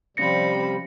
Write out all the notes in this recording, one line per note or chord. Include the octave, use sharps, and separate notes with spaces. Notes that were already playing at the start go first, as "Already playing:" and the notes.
C3 F3 G3 C4 C#4 B5 A#6 C#7